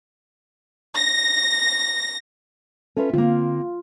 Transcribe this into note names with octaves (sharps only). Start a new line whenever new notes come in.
A#6
C#4 F4 A4 B4 E5
D3 A#3 C4 F4